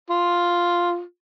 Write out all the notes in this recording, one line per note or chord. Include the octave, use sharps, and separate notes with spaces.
F4